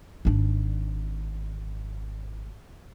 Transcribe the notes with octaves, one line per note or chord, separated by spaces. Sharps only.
G#1 D4